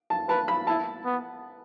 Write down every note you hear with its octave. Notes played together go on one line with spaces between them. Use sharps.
A5
B4 A5
B5
E4 A5
B3